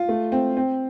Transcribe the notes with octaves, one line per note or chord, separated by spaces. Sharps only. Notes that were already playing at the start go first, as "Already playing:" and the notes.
Already playing: F4
A3
C4
C4